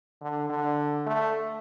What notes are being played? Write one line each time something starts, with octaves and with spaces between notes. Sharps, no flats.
D3
D3
A3